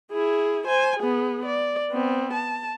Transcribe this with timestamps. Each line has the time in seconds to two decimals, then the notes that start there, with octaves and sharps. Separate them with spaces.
0.12 E4 G#4
0.67 C5 G#5
1.00 B3 G#4
1.45 D5
1.91 B3 C4
2.33 A5